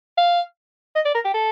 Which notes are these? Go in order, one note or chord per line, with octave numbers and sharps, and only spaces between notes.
F5
D#5
D5
A#4
G4
A4